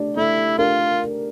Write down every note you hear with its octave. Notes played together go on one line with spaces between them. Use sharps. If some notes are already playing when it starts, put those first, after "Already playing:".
Already playing: A3 D4 G4
A3 E4
D4 F4 G4 A#4